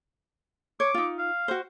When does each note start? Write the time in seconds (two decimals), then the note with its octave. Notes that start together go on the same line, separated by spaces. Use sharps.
0.80 C#5 D6
0.94 D#4 F4
1.18 F5
1.48 F#4 C5